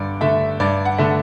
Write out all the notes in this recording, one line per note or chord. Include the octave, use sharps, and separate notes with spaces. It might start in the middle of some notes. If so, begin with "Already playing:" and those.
Already playing: G2 D3 D5
D3 A3 E5
G2 D5
F#5
D3 A3